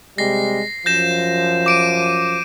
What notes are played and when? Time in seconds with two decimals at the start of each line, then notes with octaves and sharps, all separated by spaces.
0.18 C3 G3 G#3 A#6 C7
0.86 F#2 F3 G6 A#6 E7
1.66 D6 D7 D#7